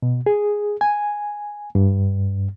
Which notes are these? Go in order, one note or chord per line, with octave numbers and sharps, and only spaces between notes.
B2
G#4
G#5
G2